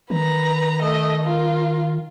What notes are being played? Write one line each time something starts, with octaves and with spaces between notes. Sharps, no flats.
D#3 B4 A#5
A3 D#5
F4 A#4